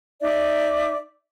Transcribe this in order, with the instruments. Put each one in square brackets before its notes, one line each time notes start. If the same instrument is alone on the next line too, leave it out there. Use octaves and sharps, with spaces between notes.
[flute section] D#4 D5 E5 D6